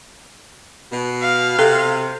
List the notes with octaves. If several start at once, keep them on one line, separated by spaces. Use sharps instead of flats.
B2
F5
C3 A4